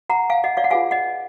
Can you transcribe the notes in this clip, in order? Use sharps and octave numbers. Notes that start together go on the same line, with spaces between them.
F#5 A#5
F5 G#5
D#5 F#5
D5 F5
F#5
F4 G#4 B4 F5 G#5
D#5 F#5